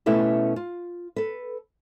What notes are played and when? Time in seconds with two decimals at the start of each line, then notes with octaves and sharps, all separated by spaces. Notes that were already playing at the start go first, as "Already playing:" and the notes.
0.06 B2 A3 C#4 E4 G4 A4
0.56 F4
1.16 A4 B4